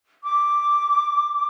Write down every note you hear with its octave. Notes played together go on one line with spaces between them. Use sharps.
D6